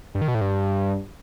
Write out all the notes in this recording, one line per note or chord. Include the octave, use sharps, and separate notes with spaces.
G2
D#3
B2
A2
G2